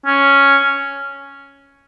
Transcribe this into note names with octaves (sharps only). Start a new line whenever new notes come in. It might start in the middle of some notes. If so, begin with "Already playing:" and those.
C#4